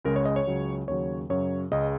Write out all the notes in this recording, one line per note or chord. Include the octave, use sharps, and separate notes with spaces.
C#2 C#3 G#3 A#4
C#5
D#5
C#5
C#2 C#3 F#3
D#2 C#3 F#3 C#5
F#2 C#3 F#3 C#5
C#2 C#3 G#3 D#5